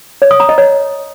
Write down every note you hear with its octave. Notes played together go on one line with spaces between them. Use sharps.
C#5
D#6
A#5
D#5
C#5